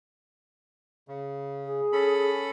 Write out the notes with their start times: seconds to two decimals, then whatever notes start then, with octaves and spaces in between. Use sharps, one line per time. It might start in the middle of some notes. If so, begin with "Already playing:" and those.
1.08 C#3
1.64 G#4
1.93 C#4 A4 B5